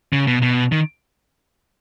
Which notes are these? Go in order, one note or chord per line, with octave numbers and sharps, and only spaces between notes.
C#3
B2
B2
D#3